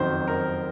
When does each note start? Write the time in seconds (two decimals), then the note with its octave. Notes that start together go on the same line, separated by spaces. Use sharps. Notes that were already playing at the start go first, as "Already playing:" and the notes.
Already playing: F#1 F2 D#3 F#3 C5
0.28 A#4